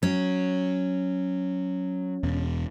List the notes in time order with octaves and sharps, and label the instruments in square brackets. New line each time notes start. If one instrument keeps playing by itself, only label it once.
[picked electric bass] F#3 [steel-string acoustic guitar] C#4
[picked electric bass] E1 E2 B2